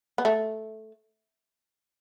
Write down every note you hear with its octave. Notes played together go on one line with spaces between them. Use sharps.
B3
A3